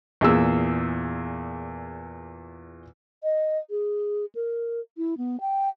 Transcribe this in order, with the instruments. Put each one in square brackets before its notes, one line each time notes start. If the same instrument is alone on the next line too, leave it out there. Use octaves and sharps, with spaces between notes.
[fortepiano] E2 A#2 G#4 E6
[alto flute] D#5
G#4
A#4
E4
B3
G5